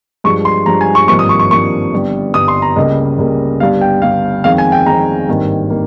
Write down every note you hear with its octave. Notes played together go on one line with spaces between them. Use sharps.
G2 F3 G#3 C#6
C6
G2 F3 G#3 A#5
G#5
C#6
G#1 G2 F3 A#3 C#6
D#6
C#6
C#6
G#1 G2 F3 A#3 C#6
G1 G2 G3
G1 G2 G3 D#6
C6
A#5
C#2 C#3 G3 A#3 D#5
C#2 C#3 G3 A#3
G1 G2 G3 F5
G5
G1 G2 G3 F5
F2 D#3 G#3 F5
G#5
G5
F2 D#3 G#3 A#5
G#1 G2 D#3 A#3
D#3 A#3